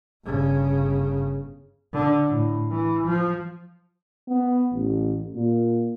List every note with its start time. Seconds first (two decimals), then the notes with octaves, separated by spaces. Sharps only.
0.24 G1 C#3
1.93 D3
2.28 A2
2.70 E3
3.06 F3
4.28 B3
4.74 A1
5.36 A#2